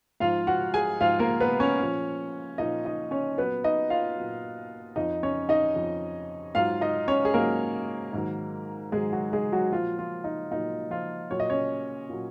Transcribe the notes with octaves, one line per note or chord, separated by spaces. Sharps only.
G#2 F3 F4 F5
F#4 F#5
G#4 G#5
G#2 F3 F4 F5
A#3 A#4
B3 B4
C#4 C#5
A#2 F3
A#2 F3 D#4 D#5
D#4 D#5
C#4 C#5
A#2 F#3 B3 B4
D#4 D#5
F4 F5
A#2 F#3
F2 F3 D#4 D#5
C#4 C#5
D#4 D#5
F2 F3
G#2 F#3 F4 F5
D#4 D#5
C#4 C#5
G#4
G#2 F#3 A#3 A#4
G#2 D#3 F#3
G#2 D#3 F#3 G#3 G#4
F#3 F#4
G#3 G#4
F#3 F#4
A#2 F3 F#3 F4
F3 F4
D#4
A#2 F#3 D#4
F3 F4
A#2 F#3 C#5
D#5
C#4 C#5
A#2 F#3